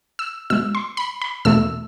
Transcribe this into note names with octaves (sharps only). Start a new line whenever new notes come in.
E6
B2 G#3 E6
C6
B5
B5
E2 B2 A3 E6